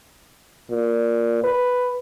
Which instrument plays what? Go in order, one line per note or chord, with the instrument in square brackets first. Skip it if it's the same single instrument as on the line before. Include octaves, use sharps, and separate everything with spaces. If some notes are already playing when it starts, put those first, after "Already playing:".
[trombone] A#2
B4